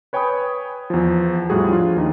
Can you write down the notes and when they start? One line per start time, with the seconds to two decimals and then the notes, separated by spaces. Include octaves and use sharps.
0.13 B4 C#5 G5 G#5 B5 D#6
0.90 E2 F3
1.50 A2 G3 F4 F#4 G#4
1.69 F3 D4 F4
1.97 D#2 D#4